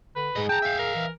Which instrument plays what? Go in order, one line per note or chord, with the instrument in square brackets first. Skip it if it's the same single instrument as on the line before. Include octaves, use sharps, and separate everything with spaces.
[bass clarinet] D3 [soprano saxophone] B4
[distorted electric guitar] G#2 D#5 [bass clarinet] G#4
[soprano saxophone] G5 [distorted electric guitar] A5 A#5
[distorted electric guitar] E5 F5
[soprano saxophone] A#4
[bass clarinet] E3